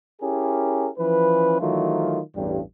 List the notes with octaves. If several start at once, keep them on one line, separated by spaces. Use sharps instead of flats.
C#4 E4 G4 G#4 A#4
E3 F3 C#4 B4
D#3 E3 F#3 A3 F4
A1 E2 G2